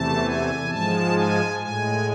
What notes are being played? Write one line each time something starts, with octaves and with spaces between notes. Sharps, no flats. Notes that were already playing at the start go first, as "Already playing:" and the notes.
Already playing: E2 C3 E3 A3 A5
G#5
G#2 F3 G#3 A5
G#5
A2 G#3 G#5